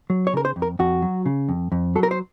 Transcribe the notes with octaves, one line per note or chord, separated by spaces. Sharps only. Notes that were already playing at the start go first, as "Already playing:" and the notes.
F#3
C#5
C#3 A#4
C5
F2
A#4
F2 F#4
F#3
C#3
F2
F2
F#3 A4
A#4
C5